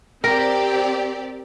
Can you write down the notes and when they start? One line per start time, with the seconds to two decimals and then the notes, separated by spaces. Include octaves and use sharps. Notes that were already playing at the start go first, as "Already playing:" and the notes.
0.24 C4 G4 A#4 D5